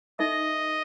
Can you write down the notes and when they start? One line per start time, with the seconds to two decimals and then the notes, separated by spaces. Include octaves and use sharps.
0.19 D#4 A4 D#5 E5